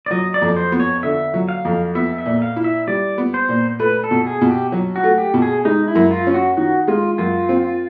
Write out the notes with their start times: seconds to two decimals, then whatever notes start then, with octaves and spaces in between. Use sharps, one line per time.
0.06 D5
0.11 F#3 D#5
0.34 D5
0.42 F2
0.57 C5
0.72 B3
0.80 C#5
1.03 D3 E5
1.34 F#3
1.49 F5
1.65 F2
1.95 B3 E5
2.18 E5
2.25 A#2
2.42 F5
2.56 E4
2.64 E5
2.87 G3 D5
3.18 B3
3.34 C5
3.49 A#2
3.79 A3 B4
4.04 A4
4.11 B2
4.27 G#4
4.41 B2
4.50 G4
4.72 F#3
4.96 F#4
5.04 A3
5.18 G4
5.34 B2
5.42 G#4
5.65 G#3 D#4
5.88 E4
5.95 F#2
6.11 F4
6.27 C#4
6.34 F#4
6.57 D#3 F#4
6.88 G#3 F4
7.18 F#2 F4
7.49 C4